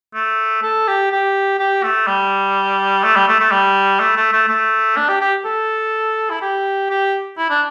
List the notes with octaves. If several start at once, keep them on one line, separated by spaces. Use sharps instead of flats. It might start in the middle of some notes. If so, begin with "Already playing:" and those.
A3
A4
G4
G4
G4
A3
G3
A3
G3
A3
A3
G3
A3
A3
A3
A3
D4
G4
G4
A4
E4
G4
G4
E4
D4